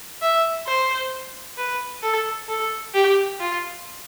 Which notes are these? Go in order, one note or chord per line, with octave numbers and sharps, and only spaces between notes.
E5
C5
B4
A4
A4
G4
F4